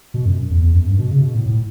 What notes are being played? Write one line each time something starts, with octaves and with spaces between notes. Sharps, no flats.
B2
F#2
E2
E2
F#2
G2
B2
C#3
B2
A2
A2